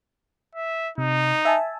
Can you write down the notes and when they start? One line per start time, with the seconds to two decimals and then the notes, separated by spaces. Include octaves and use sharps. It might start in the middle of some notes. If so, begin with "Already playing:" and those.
0.55 E5
0.98 C3 D#4
1.45 E5 G#5 A5